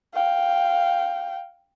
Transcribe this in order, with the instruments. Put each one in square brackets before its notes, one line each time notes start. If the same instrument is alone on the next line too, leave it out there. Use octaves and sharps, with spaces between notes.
[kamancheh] F5 G5